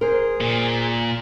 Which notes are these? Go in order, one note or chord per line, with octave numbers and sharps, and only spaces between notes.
G#4 A#4 C5
A#2